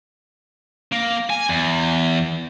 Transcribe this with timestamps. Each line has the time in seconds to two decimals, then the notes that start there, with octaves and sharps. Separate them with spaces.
0.93 A#3
1.30 G#5
1.49 E2